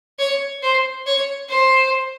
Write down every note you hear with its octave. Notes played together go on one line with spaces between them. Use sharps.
C#5
C5
C#5
C5